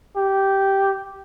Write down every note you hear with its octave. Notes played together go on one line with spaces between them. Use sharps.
G4